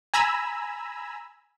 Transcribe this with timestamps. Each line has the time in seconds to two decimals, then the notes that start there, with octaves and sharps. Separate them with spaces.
0.14 G#5 A#5 B5 E6